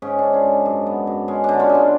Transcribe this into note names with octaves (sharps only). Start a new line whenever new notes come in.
G#2 C#4
C#4 D4
C#4 F4
G#2
D4
F#2
B3
F#2
G#3 C#4
D3 D4
C#4 F4
G#3
D4